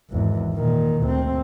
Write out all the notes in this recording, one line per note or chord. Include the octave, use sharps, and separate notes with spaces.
G#1 E2
A#2 D#3
D2 C4